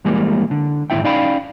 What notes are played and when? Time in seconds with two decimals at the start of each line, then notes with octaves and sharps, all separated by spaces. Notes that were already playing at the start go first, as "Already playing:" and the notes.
0.05 F2 E3 G3 G#3 A#3
0.51 D3
0.90 D#2 G#2 G#3 E4 E5 G5
1.04 C#4 D#4 D5 F5 G5 B5